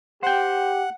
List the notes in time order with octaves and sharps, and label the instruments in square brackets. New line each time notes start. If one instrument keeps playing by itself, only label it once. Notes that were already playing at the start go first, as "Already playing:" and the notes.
[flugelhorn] G4 [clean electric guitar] C5 G5 [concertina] F#5